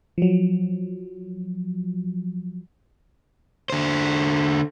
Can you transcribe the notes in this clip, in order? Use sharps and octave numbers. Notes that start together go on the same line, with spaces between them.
F3 F#3
D3 C5